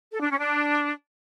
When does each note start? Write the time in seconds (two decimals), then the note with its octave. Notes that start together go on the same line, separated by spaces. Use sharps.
0.11 A4
0.20 D4
0.29 C#4
0.39 D4